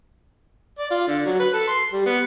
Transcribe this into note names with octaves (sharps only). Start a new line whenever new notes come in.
D5
F4
D3
F#3
B4
A4
C6
G3
B3